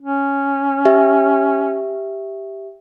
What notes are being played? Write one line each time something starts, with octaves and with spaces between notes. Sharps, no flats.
C#4
G4 E5